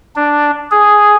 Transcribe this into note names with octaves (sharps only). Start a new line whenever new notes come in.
D4
G#4